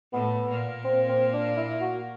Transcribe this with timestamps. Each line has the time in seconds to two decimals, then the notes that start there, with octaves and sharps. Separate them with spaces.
0.13 A2 A3 B3
0.49 A#2 A#3
0.85 C4
1.09 C4
1.33 D4
1.57 E4
1.81 F#4